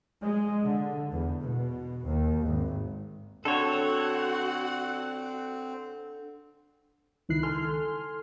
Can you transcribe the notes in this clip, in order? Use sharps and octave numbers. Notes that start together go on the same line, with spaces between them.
G#3
D3
E2
B2
D#2
G#1
D3 C4 F#4 A4 C#5 F#5
C#2 D#3 D#4 E4 F#6 C7
A4 G#5 C6 F6